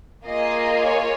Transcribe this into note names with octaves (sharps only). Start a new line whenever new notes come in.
A#3 F4 G#4 D#5
C#5